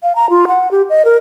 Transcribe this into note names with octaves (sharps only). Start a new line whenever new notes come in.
F5
A#5
F4
F#5
G4
D#5
A#4